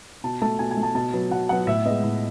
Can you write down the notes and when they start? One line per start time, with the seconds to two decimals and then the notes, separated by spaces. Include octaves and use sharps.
0.24 B2 A5
0.42 A3 A5
0.59 B2 G#5
0.71 G#5
0.77 A3
0.83 A5
0.95 B2 A5
1.13 F#3 B3
1.31 B2 F#5
1.49 F#3 B3 F#5
1.67 A2 E5
1.85 G#3 B3 D#5
2.04 A2